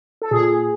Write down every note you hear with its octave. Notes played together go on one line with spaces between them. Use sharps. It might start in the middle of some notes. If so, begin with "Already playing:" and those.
A4
A#2 G#4